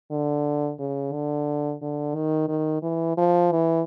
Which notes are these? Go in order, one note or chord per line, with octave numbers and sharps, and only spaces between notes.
D3
C#3
D3
D3
D#3
D#3
E3
F3
E3